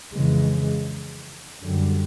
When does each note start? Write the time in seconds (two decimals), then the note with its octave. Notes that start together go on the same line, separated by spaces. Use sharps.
0.13 F2 C#3 E3 G#3
1.62 F#2 D3 G3